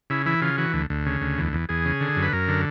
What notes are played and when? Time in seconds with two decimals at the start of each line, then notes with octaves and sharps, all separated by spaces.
0.10 C#3 E4
0.26 E3 E4
0.42 C#3 F4
0.58 E3 F#4
0.73 D2
0.90 D2
1.06 C#3
1.21 D2
1.38 E2
1.53 E2
1.69 E2 G#4
1.85 C#3
2.01 D3
2.16 F#2
2.23 B4
2.33 F#2 A#4
2.48 D3